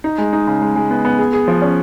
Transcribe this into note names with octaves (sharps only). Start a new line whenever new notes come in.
D#4
G#3
D#4
C#3
G#3
G#3
B3
B3
G#4
G#4
F3
C#4